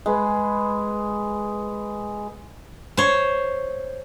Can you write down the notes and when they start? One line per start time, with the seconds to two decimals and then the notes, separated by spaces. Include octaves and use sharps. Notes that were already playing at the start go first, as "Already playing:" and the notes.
0.06 G#3 B4
2.97 C5 C#5